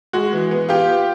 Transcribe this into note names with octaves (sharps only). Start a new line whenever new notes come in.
G#3 F#4
E3
B3
B3 F4 G4
B3